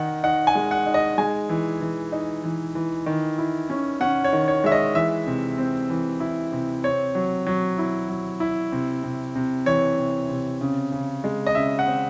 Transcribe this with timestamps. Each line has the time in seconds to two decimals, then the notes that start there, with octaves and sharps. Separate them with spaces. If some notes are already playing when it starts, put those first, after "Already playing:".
Already playing: D#3 D#4 F#5
0.24 D#4 F#5
0.47 G#5
0.55 G#3
0.71 F#5
0.86 D#4
0.94 D#5
1.18 G#3 G#5
1.49 E3
1.81 E3
2.12 D#4
2.44 E3
2.75 E3
3.06 D#3
3.38 E4
3.70 C#4
4.01 C#4 F#5
4.24 C#5
4.33 D#3
4.48 C#5
4.64 G#3 E5
4.72 D#5
4.95 E3 E5
5.27 C3
5.58 C4
5.90 E3
6.20 E4
6.52 C3
6.84 C4 C#5
7.15 F#3
7.46 F#3
7.78 E4
8.09 F#3
8.40 E4
8.72 C3
9.04 C3
9.35 C3
9.66 E3 C#5
9.98 C3
10.29 C3
10.61 C#3
10.92 C#3
11.24 G#3
11.47 D#5
11.55 C#3 E5
11.79 F#5
11.86 C4